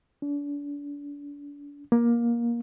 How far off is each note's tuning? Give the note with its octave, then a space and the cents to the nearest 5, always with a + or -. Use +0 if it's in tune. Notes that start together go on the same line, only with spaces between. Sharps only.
D4 -35
A#3 +20